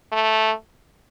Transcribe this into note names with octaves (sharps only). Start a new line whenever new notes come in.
A3